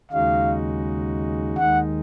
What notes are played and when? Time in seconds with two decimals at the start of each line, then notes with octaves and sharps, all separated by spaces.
0.12 D#2 C#3 G#3 D#4 F#4 F5
1.58 D#2 D#3 G#3 D#4 F#5